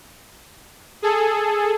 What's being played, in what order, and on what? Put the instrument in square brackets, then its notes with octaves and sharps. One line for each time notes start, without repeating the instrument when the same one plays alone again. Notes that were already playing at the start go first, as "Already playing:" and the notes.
[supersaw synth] G#4 A4